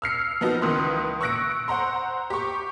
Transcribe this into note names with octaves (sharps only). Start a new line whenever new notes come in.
E6 F6 C7 C#7
F3 B3 D#4 F#4
C#2 D#3 E3 B4 C6 D#6
C#6 E6 F#6 A#6 C#7 D7
C5 F#5 A#5 C6
G4 C#6